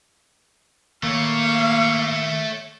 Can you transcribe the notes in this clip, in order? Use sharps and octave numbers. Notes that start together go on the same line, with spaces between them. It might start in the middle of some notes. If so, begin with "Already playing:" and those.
D#3 A3 A#3 C#5 F5